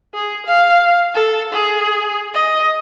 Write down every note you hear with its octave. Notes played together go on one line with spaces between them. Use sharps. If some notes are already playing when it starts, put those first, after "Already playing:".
G#4
F5
A4
G#4
D#5